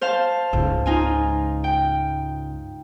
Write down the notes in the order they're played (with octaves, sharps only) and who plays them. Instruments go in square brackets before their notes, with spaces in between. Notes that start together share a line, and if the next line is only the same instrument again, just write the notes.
[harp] C5 F5 A5
[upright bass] C#2 G#2
[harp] D#4 F4 G#5
G5